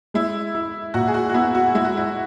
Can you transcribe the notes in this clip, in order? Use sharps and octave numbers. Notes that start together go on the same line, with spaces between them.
G#3 E4
E4
A#2 F#4
G#4
F#4
F#4
B3 E4
F#4
G#3 E4
F#4
E4